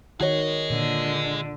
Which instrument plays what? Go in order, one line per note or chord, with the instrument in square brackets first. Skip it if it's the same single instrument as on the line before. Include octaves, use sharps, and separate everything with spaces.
[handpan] D#3 [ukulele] F#4 C#5 [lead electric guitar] G#4 D#5
[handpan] A#2 [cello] D3